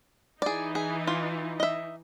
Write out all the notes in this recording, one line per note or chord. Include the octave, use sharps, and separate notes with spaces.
E3 D#4 G#4 D5
G#4
F4
D#5 E5